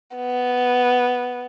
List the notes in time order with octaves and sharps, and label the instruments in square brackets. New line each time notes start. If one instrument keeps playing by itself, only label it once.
[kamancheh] B3